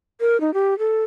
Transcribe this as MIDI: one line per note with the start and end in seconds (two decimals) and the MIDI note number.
0.21 0.40 70
0.41 0.53 63
0.54 0.77 67
0.79 1.04 69